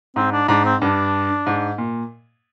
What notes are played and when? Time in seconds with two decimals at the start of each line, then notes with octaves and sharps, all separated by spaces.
0.16 G#2 C4
0.32 D4
0.48 G#2 D4
0.65 C4
0.81 G2 D4
1.47 G#2
1.78 A#2